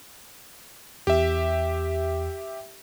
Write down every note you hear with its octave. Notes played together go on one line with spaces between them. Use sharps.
E2 G4 E5